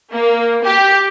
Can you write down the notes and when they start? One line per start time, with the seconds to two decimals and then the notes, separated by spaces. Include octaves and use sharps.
0.11 A#3
0.64 G4